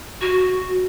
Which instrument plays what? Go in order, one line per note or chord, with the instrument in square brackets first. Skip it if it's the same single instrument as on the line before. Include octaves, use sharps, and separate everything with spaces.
[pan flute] F#4